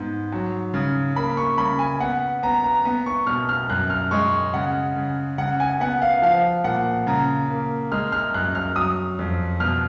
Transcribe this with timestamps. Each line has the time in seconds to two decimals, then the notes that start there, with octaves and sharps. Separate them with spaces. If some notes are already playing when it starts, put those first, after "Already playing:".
Already playing: G#2 B3
0.32 F#3
0.74 C#3
1.16 A#3 B5
1.37 C#6
1.58 C#3 B5
1.79 G#5
2.00 B3 F#5
2.43 B3 A#5
2.64 A#5
2.85 B3
3.06 C#6
3.27 B2 F6
3.49 F6
3.70 F#2 F#6
3.90 F6
4.11 G#3 C#6
4.54 C#3 F#5
4.96 C#3
5.38 C#3 F#5
5.60 G#5
5.80 B3 F#5
6.02 F5
6.22 F3 F5
6.64 A#2 F#5
7.07 C#3 A#5
7.50 A#3
7.92 G#3 F6
8.12 F6
8.34 F#2 F#6
8.55 F6
8.76 F#3 D#6
9.19 F2
9.60 B2 F6